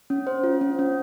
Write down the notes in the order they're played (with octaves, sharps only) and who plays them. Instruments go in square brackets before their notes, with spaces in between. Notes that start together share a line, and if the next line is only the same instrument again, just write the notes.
[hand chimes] C#4
C5
F4
C#4
C#4